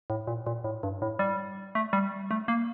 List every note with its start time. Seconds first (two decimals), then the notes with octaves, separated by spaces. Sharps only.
0.10 A2
0.27 A#2
0.47 A#2
0.64 A2
0.83 G2
1.02 A2
1.19 G3
1.75 A3
1.93 G3
2.31 A3
2.48 A#3